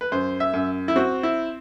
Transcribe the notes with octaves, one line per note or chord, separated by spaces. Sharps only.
B4
F#2 C5
E5
F#2
E4
C4 F#4
E4